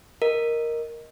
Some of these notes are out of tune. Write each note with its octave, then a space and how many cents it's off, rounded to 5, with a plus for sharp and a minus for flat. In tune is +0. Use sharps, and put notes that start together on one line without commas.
A#4 +0 D#5 +0